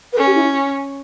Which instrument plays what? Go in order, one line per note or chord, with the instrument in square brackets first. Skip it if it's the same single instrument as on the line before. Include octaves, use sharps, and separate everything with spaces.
[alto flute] B4
[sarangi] C#4 [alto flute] A4
[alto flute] G4
E4